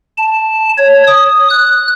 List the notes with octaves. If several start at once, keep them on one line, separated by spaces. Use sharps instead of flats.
A5
C#5
D#6
F#6